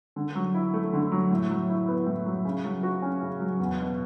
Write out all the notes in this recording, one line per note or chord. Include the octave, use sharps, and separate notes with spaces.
D3
F#3
E4
A3
D3
F#3
A2
F#3
E4
B3
A2
F#3
C#3
F#3
F#4
C#4
C#3
F#3
E2
B2